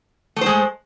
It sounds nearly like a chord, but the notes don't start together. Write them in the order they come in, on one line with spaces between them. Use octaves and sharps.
A3 C5 G#3